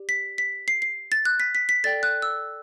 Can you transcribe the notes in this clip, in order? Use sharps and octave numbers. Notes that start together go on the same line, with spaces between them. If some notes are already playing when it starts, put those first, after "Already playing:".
Already playing: G4 D5
B6
B6
C7
C7
A6
F#6
B6
B6
B6
A4 D5 G5 A6
F#6
E6